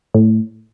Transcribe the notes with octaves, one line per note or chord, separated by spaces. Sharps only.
A2